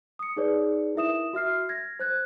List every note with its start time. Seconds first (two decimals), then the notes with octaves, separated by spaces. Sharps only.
0.19 D#6 C#7
0.37 D#4 G#4 B4 C#5 D5
0.95 E4 A#4 E5 D#6 E7
1.33 F#4 E5 F6 C7
1.69 G#6 A#6
1.99 C5 F#6 G#6